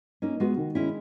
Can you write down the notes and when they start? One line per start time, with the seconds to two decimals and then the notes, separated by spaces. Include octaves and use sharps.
0.22 A#3 C#4 D#4
0.40 G#3 B3 F#4
0.57 D#3
0.75 G#3 C#4 E4